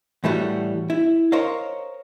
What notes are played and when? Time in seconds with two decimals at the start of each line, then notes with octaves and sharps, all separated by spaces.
0.24 A2 E3 G3 A3 F#4
0.90 E4
1.32 A#4 C5 C#5 D#5 F5